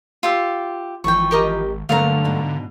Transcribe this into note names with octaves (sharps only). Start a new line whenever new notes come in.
F4 G4 E5
G#1 E3 F3 G5 C#6
G4 A#4 D#5
G2 D3 F#3 A3 A#3 C4 F5 A#5
G#2 B2 D4